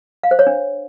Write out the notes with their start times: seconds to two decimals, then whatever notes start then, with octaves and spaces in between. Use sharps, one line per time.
0.23 F5
0.31 C5
0.39 C#5
0.47 D4